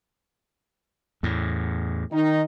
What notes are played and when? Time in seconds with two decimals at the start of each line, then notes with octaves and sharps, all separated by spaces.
1.23 E2 A2
2.11 D#3 D#4